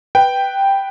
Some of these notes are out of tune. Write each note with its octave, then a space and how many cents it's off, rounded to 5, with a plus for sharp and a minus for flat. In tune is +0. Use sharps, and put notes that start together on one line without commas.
B4 +0 G5 +0